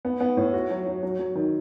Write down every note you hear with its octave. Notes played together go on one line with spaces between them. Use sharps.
B3
B3
A2
F#4
F#3
F#3
F#3
F#3
D#3